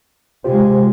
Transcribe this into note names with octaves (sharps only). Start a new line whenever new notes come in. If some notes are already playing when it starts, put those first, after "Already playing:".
C3 G#3 F4 G4 C5